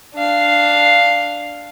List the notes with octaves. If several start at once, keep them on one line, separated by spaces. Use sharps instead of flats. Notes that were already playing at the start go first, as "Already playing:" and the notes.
D4 F5